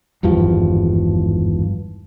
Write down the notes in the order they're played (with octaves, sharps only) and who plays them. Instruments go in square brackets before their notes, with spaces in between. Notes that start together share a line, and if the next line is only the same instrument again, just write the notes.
[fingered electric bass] G#1 E2 G2 F3